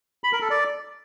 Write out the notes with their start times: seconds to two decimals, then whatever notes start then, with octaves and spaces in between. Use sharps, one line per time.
0.24 B5
0.33 A#4
0.41 A4
0.50 D5